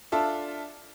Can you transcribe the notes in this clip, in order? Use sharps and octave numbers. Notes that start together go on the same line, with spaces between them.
D4 F4 A4 E5